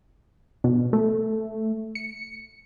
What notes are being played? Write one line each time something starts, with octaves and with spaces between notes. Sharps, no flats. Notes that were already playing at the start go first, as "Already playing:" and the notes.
B2
A3
C#7